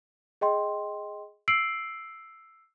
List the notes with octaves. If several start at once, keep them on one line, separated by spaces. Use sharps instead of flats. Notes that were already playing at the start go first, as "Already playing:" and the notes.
G#4 D#5 G5 C6
E6 C7 D7 F#7